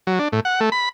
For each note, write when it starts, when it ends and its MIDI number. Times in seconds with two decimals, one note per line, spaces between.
0.07 0.19 54
0.19 0.28 62
0.32 0.40 45
0.45 0.60 78
0.60 0.70 57
0.72 0.89 83